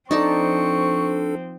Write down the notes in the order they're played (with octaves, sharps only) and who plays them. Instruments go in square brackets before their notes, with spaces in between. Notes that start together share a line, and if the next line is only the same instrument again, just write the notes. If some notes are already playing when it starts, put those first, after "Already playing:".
[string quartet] F3 C4 [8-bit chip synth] D4 A4 [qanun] D#4 D5 A5 [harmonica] C#6